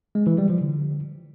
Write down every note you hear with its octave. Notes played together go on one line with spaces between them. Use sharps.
G#3
E3
G3
F3
D3